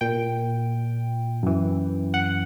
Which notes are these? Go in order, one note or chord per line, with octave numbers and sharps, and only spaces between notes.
A#2 G5
F#2 E3
F#5